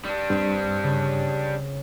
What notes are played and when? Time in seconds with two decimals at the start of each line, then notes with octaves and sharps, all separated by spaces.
0.05 G3 D4
0.30 G2 C4
0.83 C#3